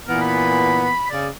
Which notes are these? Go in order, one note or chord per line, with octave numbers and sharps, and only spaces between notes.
A#2 E3 B3 A#4
B5
C#3 D5